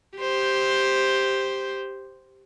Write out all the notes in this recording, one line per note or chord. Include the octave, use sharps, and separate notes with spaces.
G4 C5